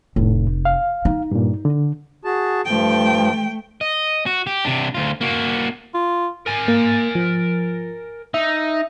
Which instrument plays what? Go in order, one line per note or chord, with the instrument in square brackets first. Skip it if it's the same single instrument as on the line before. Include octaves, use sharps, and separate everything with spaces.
[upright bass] F1 [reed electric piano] A2
[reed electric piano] F5
[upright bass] D#4
[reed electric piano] G2 A#2
D3
[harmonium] F#4 G#4 A5
[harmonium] G2 F3 [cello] A3 G5
[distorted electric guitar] D#5
F#4
G4
C3 D4
D2 F4
A#3 F#4
[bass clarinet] F4
[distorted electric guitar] A#4 G#5
[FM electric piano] A#3
F3
[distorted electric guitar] D#4 [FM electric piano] E5